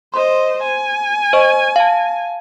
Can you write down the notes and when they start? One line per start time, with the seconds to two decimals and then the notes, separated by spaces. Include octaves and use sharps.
0.14 C5 D#5 C6
0.63 G#5
1.33 C5 D#5 C#6
1.76 F5 A5